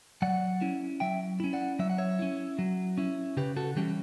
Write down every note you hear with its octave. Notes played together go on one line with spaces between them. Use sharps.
F#3 D5 F#5
C#4 E4
F#3 E5 G5
C#4 E4
D5 F#5
F#3 E5
F#5
C#5 E5
C#4 E4
F#3
C#4 E4
C#3 G4 B4
F#4 A4
E3 G3 C#4 G4